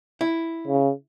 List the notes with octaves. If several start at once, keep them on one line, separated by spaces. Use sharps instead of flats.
E4
C#3